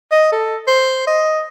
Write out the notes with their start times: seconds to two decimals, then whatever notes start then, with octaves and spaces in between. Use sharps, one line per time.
0.12 D#5
0.32 A4
0.67 C5
1.07 D#5